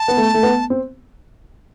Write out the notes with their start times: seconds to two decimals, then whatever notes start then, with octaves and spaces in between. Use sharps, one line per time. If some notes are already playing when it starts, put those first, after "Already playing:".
Already playing: A5
0.08 B3
0.17 A3
0.34 A3
0.43 B3
0.70 C4